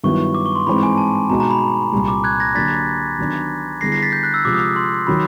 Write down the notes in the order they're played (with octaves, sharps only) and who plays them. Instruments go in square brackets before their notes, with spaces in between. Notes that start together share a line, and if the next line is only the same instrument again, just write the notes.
[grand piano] G2 D#3 F#3 B3 E4 [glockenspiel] C#6
[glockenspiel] D6
C#6
C6
[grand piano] G#2 E3 G#3 C4 D#4 [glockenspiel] B5
[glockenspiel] G#5
A5
[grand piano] B2 G#3 B3 D#4 F#4 [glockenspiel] A#5
[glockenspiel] A#5
B5
[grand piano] C2 A#2 G3 A#3
[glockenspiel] D6
F#6 G#6
G#6 A#6
[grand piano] D3 F#3 A#3 D4 [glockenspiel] A6 B6
[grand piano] D#3 F#3 B3 D4
[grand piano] D3 G3 B3 E4 G#4 [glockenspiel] A#6 C7
[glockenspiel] A#6 C7
A6 B6
G6
F#6
E6
[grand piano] C3 F3 G#3 [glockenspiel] D6
[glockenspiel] D#6
C6
[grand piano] D#3 F#3 [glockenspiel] B5